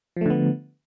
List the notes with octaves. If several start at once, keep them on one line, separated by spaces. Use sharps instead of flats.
D3 F3 A3 B3